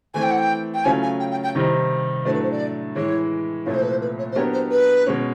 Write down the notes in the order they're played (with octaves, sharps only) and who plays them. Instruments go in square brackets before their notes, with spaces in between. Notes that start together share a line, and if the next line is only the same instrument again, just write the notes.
[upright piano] E3 A3 C4 [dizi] G#5
[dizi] G5
F#5
G5
G5
[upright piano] C#3 F#3 A3 C#4 F4 [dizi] G#5
[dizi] G#5
G5
G5
G5
[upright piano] C3 D#3 G3 C4 D#4
[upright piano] A2 F#3 A3 D4 [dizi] C5
[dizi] B4
C5
D5
[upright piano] A2 E3 G#3 [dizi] C#5
[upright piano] C2 A#2 F3 A3 C4 [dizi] C#5
[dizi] C5
B4
C5
B4
C#5
C5
[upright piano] F#3 B3 D4 G4 A#4 [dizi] C#5
[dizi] C5
B4
[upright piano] B2 G#3 C#4